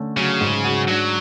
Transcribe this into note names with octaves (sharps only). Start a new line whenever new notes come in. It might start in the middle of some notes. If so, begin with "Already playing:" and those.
Already playing: D3 A3 C#4
C#3 F#3
G#2
F#4
F#3 D4